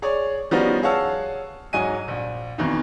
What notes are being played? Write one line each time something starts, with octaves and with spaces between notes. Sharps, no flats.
G#4 C#5 D5
F3 G3 B3 C#4 D#4 F#4
G#4 C#5 F5 F#5 A5 E6
G#2 F#3 D#5 G#5 D#7
A#1
F2 B2 D#3 E3 D#4